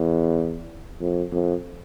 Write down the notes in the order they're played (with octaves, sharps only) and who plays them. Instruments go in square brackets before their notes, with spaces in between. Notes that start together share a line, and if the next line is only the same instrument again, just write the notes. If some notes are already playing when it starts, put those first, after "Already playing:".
Already playing: [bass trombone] E2
F2
F2